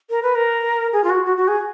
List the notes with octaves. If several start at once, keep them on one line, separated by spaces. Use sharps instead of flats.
A#4
B4
A#4
G#4
F4
F#4
F#4
F#4
G#4